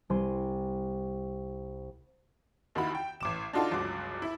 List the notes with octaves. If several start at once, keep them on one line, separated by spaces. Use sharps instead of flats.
C2 C4 G#5 C6
D#2 D#3 E4 F#4 B5
G5
A1 D6 E7
D4 D#4 F4 F#4 A4
G1 C#2 F#3 D6
E4